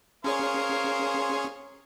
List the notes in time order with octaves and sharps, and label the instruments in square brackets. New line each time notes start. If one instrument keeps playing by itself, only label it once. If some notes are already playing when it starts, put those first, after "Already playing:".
[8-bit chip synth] C#4 G#4 C#5 [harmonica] A#4 C5 F5